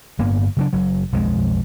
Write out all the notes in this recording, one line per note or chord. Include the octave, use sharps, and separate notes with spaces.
G1 G2 A#3 B3
C#3 F#3 D4
F#1 F#3
B1 F2 F3 G#3